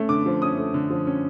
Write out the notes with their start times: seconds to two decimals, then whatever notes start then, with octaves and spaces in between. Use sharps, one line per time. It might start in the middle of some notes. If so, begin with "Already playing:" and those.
Already playing: A3 C#4
0.09 D3 D6
0.26 F3
0.42 C#4 D#6
0.58 A3
0.74 D3
0.90 F3
1.07 C#4